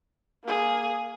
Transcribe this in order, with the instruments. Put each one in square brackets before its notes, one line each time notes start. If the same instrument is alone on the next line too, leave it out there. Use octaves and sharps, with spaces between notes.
[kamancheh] A#3 G#4